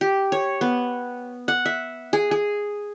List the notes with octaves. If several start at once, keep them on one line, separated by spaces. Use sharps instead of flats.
G4
C#5
B3
F#5
E5
G#4
G#4